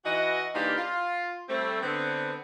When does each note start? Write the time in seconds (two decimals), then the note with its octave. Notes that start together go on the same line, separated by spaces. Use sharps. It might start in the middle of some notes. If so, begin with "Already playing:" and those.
0.05 E3 F#4 D#5
0.53 E3 A#3 D4 D#4 F4 G4
0.78 F4
1.49 G3 A3 C4
1.81 D3 B3 C4